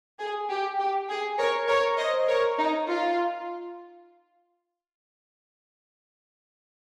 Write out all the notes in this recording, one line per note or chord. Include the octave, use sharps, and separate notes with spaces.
G#4
G4
G4
G#4
A#4 C#5
A#4 C#5
C5 D#5
A#4 C#5
D#4
F4